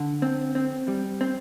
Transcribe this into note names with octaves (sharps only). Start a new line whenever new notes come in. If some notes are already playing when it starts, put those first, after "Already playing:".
Already playing: D3
C4
C4
G3
C4